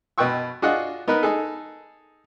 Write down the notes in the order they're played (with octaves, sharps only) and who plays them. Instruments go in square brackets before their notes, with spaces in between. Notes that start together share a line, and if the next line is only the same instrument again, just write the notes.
[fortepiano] B2 B4 D#5 G5 C#6 E6
D4 F4 F#4 G#4 D#5 F#5
B3 D#4 A#4 B4
D#4 G#4 A4